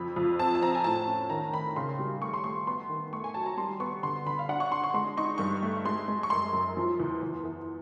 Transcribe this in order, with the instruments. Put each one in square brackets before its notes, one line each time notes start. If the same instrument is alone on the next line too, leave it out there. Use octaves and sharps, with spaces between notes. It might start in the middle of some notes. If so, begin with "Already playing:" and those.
Already playing: [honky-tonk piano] F2 B5
F2
C4 A5
A5
C4 A#5
G#5
A2 A5
C#4
D#3 A#5
D#3 B5
C#3 C6
G3
A3 C#6
C6
A3 C#6
B3 C6
D#3
A3 C#6
G#5
F#3 A5
A#5
G3 C6
B3 C#6
D3 C6
D3 B5
F5
D4 F#5
C#6
D4 C6
C#6
G#3 C6
D#4 C#6
G2 C#6
A3
G#3 C6
G#3
C#6
F#2 C6
F#2
F3
E2
E2
E3